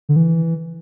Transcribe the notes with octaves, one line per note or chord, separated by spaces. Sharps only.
D3
E3